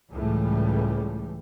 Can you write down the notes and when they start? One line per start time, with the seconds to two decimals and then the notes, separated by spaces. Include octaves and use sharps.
0.11 C#2 A2 E3 G3